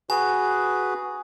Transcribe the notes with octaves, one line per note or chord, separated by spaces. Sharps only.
F#4 G#4 B4 G#5